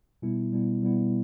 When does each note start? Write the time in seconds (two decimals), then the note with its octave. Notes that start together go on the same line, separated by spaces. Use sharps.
0.22 B2 G3 B3 E4
0.52 B2 G3 B3 E4
0.82 B2 G3 B3 E4